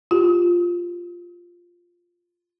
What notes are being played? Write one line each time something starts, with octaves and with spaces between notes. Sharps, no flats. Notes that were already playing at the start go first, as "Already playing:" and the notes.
F4 G4